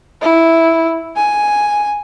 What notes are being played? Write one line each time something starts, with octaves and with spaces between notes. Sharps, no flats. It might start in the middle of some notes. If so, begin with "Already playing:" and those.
E4
G#5